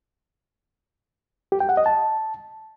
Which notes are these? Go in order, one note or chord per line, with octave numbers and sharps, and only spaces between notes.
G4
G5
F#5
D#5
A5